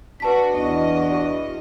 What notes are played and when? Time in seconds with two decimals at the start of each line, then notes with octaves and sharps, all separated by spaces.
0.20 D4 F#4 B4 A5 B6
0.56 E2 D4 F#4 D#5